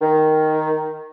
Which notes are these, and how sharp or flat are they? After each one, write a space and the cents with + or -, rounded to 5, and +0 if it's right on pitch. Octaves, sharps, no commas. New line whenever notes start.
D#3 +0